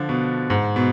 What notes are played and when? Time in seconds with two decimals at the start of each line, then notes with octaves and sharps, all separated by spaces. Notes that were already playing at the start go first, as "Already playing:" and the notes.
Already playing: D3 F3
0.09 B2
0.50 G#2
0.76 B2